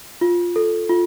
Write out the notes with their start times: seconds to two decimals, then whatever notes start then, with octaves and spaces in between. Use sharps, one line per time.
0.21 F4
0.56 A4
0.89 F4